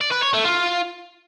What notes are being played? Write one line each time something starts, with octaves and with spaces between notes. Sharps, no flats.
D5
B4
C#5
A3
F4